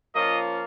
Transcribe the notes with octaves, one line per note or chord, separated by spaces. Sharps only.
F3 A#3 C#4 F4 D#5